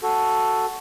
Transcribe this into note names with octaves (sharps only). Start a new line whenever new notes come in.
F#4 A4